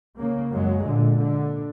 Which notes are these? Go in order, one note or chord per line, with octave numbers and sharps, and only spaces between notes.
C#3 A#3
F#2 F#3 G#3
A#2 D3
D3